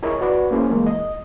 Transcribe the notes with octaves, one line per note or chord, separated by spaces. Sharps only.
E4 G#4 A#4 C#5 D#5
F#4 B4 D5
A#3 C#4 E4 G#4 C5
E3 G#3 A#3
D#5